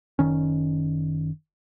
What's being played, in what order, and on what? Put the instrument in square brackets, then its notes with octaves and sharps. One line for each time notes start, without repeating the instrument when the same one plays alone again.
[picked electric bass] F#1 C2 D#3 C#4